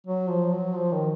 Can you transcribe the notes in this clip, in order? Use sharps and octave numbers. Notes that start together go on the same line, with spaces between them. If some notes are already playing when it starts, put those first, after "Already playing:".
F#3
F3
F#3
F3
D#3